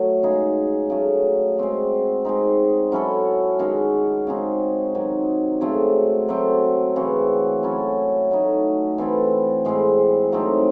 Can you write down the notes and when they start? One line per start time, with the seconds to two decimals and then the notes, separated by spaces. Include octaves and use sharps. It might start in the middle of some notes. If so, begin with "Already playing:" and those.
Already playing: F#3 A3
0.23 C#3 G#3 D#4 G#4
0.90 C#3 F#3 A3
1.58 G#3 C4 F#4
2.25 G#3 C4 D#4
2.92 F#3 C#4 E4 A4
3.59 D#3 G#3 C#4 F#4
4.27 C#3 G#3 C4 D#4
4.95 C3 D#3 F#3
5.61 C#3 F#3 A3 C4
6.29 F#3 A3 C4
6.96 C#3 E3 C4 F#4
7.63 F#3 C#4 E4 A4
8.31 F#3 A3 D#4
8.98 E3 C4 E4 A4
9.65 A2 G#3 C4
10.32 F#3 A3 C4 D#4